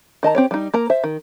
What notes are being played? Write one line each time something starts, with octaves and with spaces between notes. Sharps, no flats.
D#3 D#5 A5 A#5
C4 G4 C#5
G3 D#4
A#3 A#4 A#5
C5 E5
D#3